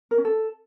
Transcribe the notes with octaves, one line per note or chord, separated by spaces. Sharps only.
A#4
C#4
A4